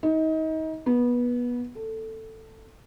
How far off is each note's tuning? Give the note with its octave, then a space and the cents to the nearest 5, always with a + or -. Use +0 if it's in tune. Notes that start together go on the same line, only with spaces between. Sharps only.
D#4 +30
B3 -20
A4 +10